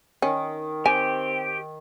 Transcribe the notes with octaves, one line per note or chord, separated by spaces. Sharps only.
D#3 C#4
C4 G4 G#5